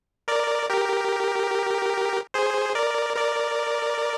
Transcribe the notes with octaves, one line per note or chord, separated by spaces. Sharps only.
A#4 D5
G4 A#4
G#4 C5
A#4 D5
A#4 D5